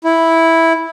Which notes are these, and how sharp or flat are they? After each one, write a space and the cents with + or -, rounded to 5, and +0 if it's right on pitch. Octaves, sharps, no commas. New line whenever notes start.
E4 -5